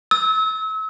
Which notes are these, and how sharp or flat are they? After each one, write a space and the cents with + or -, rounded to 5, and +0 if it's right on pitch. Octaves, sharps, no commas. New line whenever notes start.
E6 -35